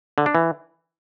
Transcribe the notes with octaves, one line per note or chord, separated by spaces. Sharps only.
D3
D4
E3